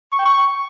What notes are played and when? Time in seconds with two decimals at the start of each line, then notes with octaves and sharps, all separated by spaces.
0.12 C#6
0.19 G5
0.25 C#6